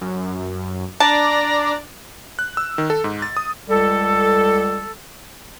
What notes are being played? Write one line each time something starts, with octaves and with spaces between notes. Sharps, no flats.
F#2
D4 D5 A5 A#5
F#6
E6
D#3
A4
G#2
A6
D#6
C#2 G3 A4